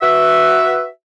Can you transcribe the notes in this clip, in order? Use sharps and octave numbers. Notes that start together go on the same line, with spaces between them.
F#4 B4 E5